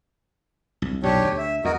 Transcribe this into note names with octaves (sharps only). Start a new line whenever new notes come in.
C2
B1 G2 A#2 D4 G4 C#5
D2
E5
E2 F#4 A#4 D#5